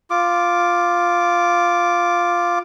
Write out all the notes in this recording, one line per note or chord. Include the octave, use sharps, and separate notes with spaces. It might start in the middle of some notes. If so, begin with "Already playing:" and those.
F4 D6